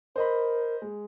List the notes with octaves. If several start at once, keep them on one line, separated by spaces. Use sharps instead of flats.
A#4 C5 D#5 B5
G#3